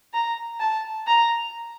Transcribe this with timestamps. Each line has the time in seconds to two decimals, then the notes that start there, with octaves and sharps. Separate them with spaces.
0.13 A#5
0.60 A5
1.07 A#5